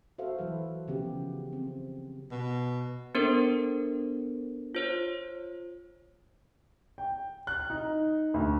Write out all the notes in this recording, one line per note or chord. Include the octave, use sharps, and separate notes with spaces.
F#4 A4 C5 E5 F5
E3 F#3 B4
C#3 F3 B3 G4
C4
B2
B3 D4 A4 A#4 C5
F4 C5 C#5
G5
F#6
D#4
D2